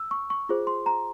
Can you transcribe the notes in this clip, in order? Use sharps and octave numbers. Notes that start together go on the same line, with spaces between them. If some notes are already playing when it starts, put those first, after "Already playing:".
Already playing: E6
C#6
C#6
F4 G#4 C5
C6
A#5